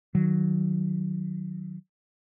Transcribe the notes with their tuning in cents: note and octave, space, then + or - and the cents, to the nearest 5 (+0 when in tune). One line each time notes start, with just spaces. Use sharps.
D#3 +0 F#3 +5